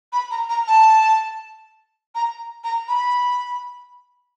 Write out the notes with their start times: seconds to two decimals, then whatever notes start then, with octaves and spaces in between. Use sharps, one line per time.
0.12 B5
0.31 A#5
0.49 A#5
0.67 A5
2.15 A#5
2.64 A#5
2.88 B5